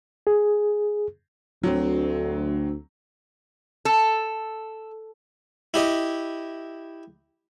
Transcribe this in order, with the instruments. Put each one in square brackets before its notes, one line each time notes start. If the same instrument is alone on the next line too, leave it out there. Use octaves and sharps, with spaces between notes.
[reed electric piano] G#4
[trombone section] D2 [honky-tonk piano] F#3 C4
[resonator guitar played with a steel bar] A4
[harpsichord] E4 G4 D#5